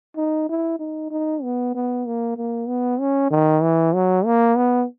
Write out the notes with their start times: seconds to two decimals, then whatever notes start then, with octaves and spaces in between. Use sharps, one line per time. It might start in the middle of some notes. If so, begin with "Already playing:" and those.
0.16 D#4
0.49 E4
0.80 D#4
1.11 D#4
1.43 B3
1.75 B3
2.06 A#3
2.37 A#3
2.68 B3
3.00 C#4
3.31 D#3
3.63 E3
3.94 F#3
4.25 A#3
4.57 B3